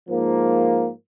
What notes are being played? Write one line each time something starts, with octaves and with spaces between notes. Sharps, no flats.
G#2 F3 A#3